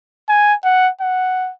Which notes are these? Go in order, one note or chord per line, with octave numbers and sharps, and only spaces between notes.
G#5
F#5
F#5